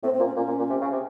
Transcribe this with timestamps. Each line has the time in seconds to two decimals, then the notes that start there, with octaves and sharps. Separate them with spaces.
0.03 A2 C4
0.14 C4
0.20 A#2
0.25 C#4
0.36 A#2 C#4
0.47 A#2
0.59 A#2
0.70 C3
0.81 C#3
0.92 C3